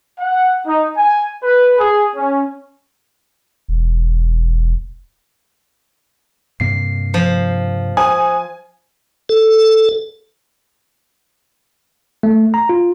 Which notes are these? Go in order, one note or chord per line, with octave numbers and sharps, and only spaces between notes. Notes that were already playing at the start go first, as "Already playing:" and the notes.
F#5
D#4
G#5
B4
G#4
C#4
E1
G2 C3 A#3 C7
F3
C5 G#5 D#6
A4
A3
A#5
F4